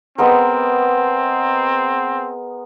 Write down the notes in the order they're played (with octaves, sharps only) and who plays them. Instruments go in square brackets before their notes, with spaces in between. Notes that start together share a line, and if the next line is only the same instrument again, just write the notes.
[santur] G#3 B3 A#4 [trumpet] C4